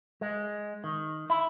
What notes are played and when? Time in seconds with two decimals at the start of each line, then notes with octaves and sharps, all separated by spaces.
0.21 G#3
0.84 D#3
1.30 E4